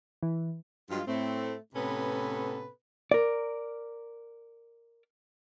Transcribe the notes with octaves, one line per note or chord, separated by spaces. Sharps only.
E3
G2 F#3 G#3 F4
A2 A3 C4
A2 C3 B3 C#4 A4 B4
A#4 D5